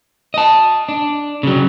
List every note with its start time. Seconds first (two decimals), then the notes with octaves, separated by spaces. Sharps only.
0.34 D#5 A5
0.89 D4
1.43 C#3 F#3